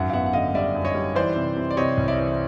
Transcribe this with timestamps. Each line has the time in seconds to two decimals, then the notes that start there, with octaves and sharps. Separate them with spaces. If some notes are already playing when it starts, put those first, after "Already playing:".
Already playing: G#1 F#2 E5 F#5
0.09 F5
0.13 B3 E5 F#5
0.26 F#5
0.33 D3 D#5 F5
0.54 G3 D5 E5
0.75 F#2
0.85 C#5 D#5
0.95 G3
1.15 E3 C5 D5
1.36 C3
1.56 C3
1.71 D5
1.77 C3 C#5 D#5
1.97 C2
2.08 D5 E5
2.18 E3